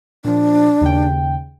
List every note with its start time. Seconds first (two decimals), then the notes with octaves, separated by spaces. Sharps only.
0.24 A#2 F3 D4
0.81 D#2 C#3 G5